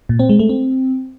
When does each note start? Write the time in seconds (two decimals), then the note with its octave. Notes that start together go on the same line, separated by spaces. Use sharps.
0.09 A#2
0.19 C4
0.29 G#3
0.39 A3
0.49 C4